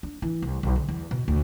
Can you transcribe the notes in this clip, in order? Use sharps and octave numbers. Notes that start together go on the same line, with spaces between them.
D4
E3
C2
B1
D3
E2
B2
D2